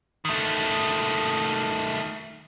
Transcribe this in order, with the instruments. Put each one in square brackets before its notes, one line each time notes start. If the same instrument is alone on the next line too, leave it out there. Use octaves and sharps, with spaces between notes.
[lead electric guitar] D#3 A3